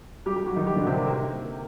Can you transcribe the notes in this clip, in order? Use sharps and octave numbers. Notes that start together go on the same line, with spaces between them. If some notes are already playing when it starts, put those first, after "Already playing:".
G3 G4
G3 G4
F#3 F#4
D#3 D#4
G3 G4
D3 D4
C3 C4
A#3
A#3